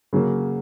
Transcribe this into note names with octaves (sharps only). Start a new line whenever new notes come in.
C#3 F#3 A#3